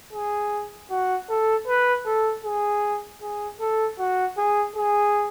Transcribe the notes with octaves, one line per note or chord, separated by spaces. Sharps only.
G#4
F#4
A4
B4
A4
G#4
G#4
A4
F#4
G#4
G#4